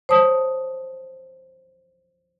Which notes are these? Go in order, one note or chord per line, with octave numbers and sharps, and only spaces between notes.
C5 C#5 A5 D#6